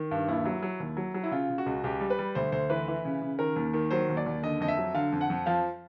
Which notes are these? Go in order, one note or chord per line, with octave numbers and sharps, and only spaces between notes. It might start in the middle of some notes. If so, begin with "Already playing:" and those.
Already playing: D#3
G2
D#2 E4
F#3
F#3
D#2
F#3
F#3
E4
C#3 F4
C#3
F#4
C#2
C#2 G4
G3
B4
G3
D2 C5
D2 C5
E3 B4
E3
C#3
C#3
D#3 A#4
D#2
D#3
F#3 C5
D#2
D5
D#2
D3 D#5
F2 D#5
E5
F#3
D3 F5
F2
F#5
F2
F3 F5